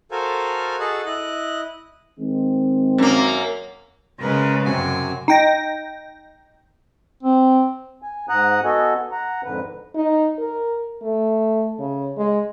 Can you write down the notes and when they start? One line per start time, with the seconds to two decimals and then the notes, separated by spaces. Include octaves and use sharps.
0.11 F#4 A4 A#4 C5 F5 G#5
0.79 F#4 G#4 A4 D#5 F#5 A5
1.05 E4 D#5 F#6
2.19 D#3 G#3 C4
2.98 F#2 A#3
4.21 C#3 G#3 A#4 B4
4.66 F#2 C3 F#4 G#5
5.28 D#4 G5 A#6
7.23 C4
8.02 G#5
8.29 G#2 F#5 A#5 D#6 F#6
8.64 B3 F#4 A4 D#5 G#5
9.12 F#5 A#5
9.44 F2 G#2 D3 B4
9.95 D#4
10.38 A#4
11.02 A3
11.79 C#3
12.17 G#3